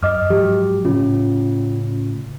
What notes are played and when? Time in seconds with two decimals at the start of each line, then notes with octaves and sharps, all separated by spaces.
0.03 F#2 D#5 D6 F6
0.30 G#2 F3 F#3 G4
0.85 A2 C#3 C#4 F4